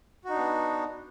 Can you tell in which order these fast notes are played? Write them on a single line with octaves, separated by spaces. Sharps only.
F#4 D#4 D4 B3